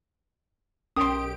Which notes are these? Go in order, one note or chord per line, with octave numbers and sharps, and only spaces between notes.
B1 C#4 G4 A#4 G5 C6 D#6 D7